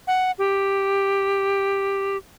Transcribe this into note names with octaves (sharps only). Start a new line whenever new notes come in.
F#5
G4